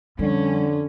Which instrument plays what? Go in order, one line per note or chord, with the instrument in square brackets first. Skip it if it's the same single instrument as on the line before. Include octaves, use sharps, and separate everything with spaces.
[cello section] F2 C#4 [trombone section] D3 [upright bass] G3